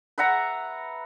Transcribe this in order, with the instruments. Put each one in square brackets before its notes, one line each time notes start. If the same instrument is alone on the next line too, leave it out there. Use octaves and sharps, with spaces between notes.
[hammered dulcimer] B4 E5 F#5 A#5